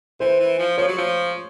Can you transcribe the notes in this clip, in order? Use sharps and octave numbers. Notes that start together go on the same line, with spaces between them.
E3 C5
E3
F3
F3 C#5
F#3
F3